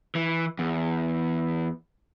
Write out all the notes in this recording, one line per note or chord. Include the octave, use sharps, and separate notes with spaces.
E3
E2